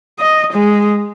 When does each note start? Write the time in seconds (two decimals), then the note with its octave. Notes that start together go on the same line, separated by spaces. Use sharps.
0.20 D#5
0.53 G#3